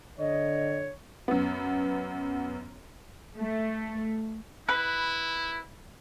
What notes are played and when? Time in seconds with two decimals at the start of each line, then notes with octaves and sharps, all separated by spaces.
0.19 D3 C#5 D#5
1.28 F#2 B3
3.36 A3
4.69 E4 B4